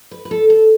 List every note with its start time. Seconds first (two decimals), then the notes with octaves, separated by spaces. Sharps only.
0.11 B4
0.25 B4
0.31 A4
0.50 A4